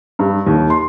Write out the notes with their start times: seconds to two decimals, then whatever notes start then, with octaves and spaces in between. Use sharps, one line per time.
0.19 G2
0.47 D#2
0.70 C6